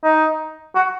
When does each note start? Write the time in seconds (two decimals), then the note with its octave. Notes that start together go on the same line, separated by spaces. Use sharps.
0.04 D#4
0.75 F#4